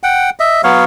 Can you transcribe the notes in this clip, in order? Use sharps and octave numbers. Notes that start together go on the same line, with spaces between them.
F#5 G5
D#5 E5
F#3 B3 C#5 F5